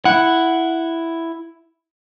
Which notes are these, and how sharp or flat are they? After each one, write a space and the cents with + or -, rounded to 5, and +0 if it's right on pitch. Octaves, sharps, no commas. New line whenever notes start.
E4 +5 F#5 +0